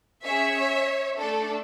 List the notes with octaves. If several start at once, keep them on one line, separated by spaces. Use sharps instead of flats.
C#4 G#4 C#5 E5
A3 D4 A4